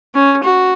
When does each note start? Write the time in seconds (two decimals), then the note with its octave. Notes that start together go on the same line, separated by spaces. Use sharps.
0.15 C#4
0.43 F#4